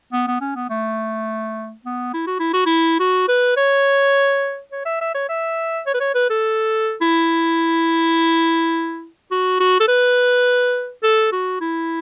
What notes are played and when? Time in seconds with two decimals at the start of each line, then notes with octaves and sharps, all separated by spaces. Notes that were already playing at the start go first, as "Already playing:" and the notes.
0.12 B3
0.27 B3
0.41 C#4
0.55 B3
0.69 A3
1.85 B3
2.13 E4
2.27 F#4
2.39 E4
2.53 F#4
2.66 E4
3.00 F#4
3.28 B4
3.57 C#5
4.72 C#5
4.85 E5
5.01 E5
5.15 C#5
5.29 E5
5.86 C#5
5.94 B4
6.00 C#5
6.14 B4
6.30 A4
7.01 E4
9.31 F#4
9.60 F#4
9.80 A4
9.88 B4
11.03 A4
11.32 F#4
11.61 E4